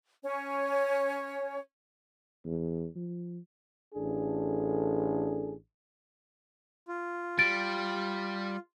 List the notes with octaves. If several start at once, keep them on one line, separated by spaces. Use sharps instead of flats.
C#4 C#5
E2
F3
A1 D4 G#4 A4
F4
G3 A6 D7